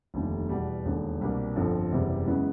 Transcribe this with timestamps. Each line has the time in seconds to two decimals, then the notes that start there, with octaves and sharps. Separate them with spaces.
0.14 F1 D#2 D3 G3
0.49 E2 B2 G3
0.85 E1 D#2 D3
1.21 C2 B2 G3 A#3 D4
1.56 G1 F2 D3 F3
1.91 F#1 E2 C3 E3 G3
2.27 F#2 C#3 E3 G#3 B3